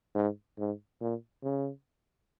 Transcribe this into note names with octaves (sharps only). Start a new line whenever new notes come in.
G#2
G#2
A#2
C#3